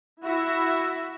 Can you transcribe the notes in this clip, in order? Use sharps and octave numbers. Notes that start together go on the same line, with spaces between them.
E4 F#4 E5